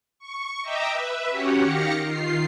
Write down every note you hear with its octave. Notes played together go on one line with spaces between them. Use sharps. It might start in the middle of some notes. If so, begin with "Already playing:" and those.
C#6
D#5 E5 G5 A#5 D6 E6
B4 E5
C#4 F#4 G4 C#5 F#5
D#3 G4 F5 A#6 C#7
D#3 F4 C7